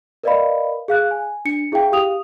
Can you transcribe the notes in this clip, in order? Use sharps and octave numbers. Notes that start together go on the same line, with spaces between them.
A#4 B4 D5 D#5 F5 B5
G#4 F5 F#6
G#5
D4 C#7
E4 G#4 E5 F5 G5
G4 F5 D#6 F7